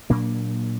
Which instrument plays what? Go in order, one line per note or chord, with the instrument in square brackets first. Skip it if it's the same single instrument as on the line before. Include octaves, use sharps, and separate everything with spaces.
[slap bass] A#2 F#3 A#3 D4